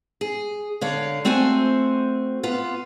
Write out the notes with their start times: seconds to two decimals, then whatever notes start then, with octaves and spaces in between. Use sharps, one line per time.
0.21 G#4
0.81 D3 C#5 F5
1.25 A3 C4 F#4 C5 G#5
2.43 B3 F4